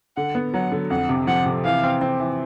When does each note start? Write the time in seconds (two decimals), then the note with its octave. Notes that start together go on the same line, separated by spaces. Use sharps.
0.17 D3 F#5
0.35 B3
0.54 F#3 F#5
0.72 D3
0.90 F2 F#5
1.09 C3
1.27 F3 F#5
1.46 C3
1.64 E3 F5
1.84 C4
2.01 C4
2.20 E3